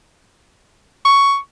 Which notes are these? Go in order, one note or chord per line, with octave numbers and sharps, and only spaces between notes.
C#6